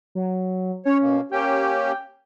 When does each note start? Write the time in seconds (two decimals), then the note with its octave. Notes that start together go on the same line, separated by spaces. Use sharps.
0.15 F#3
0.85 C#4 C#5
1.01 B2 A#3
1.32 A#3 C#4 G4 G5